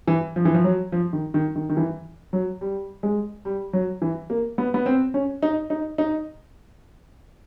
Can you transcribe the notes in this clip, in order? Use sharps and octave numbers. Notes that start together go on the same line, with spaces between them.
E3
F3
E3
F3
F#3
F3
D#3
D#3
D#3
D#3
E3
F#3
G3
G#3
G3
F#3
E3
A#3
B3
B3
C4
C#4
D#4
D#4
D#4